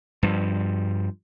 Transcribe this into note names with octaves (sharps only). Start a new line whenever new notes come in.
G2 F3